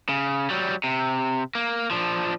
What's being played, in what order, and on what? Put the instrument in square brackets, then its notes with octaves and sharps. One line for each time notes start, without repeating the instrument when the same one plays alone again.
[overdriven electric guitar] C#3
F#3 G3
C3
A#3
F3 D4